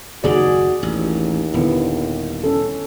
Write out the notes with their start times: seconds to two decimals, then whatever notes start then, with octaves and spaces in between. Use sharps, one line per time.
0.24 F#1 D#2 D#3 F#4 G#4 D5
0.83 A1 D#2
1.54 D#1 D3 B3 E4
2.44 C#4 A4